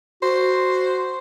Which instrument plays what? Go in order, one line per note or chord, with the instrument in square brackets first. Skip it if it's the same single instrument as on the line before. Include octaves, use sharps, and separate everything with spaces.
[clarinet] F#4 [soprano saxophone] C5